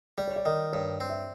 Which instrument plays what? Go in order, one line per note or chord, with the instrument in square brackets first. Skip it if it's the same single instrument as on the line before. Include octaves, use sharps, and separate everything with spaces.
[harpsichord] G3 [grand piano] D5
[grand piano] C#5
D5
[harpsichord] D#3 [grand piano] D#5
[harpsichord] G2 [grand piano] C#5
[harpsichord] C4
[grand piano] E5